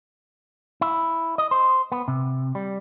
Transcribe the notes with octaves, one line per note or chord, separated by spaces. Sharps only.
E4
D#5
C5
B3
C3
G3